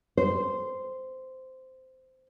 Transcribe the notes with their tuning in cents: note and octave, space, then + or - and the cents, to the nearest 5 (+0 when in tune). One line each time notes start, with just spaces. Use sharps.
C5 -10